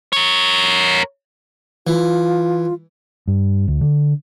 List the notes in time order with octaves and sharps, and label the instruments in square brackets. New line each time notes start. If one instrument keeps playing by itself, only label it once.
[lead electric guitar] A#4 C#5
[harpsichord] E3 [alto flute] F4
[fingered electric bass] G2
D2
D3